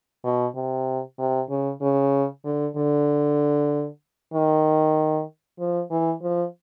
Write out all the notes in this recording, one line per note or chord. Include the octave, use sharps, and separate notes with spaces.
B2
C3
C3
C#3
C#3
D3
D3
D#3
F3
E3
F3